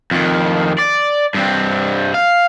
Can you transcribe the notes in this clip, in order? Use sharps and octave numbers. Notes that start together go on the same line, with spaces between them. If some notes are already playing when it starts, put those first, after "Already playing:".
F2 D#3
D5
G2 C4
F5